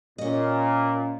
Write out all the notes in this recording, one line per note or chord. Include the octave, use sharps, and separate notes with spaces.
A#2 C#4 D#5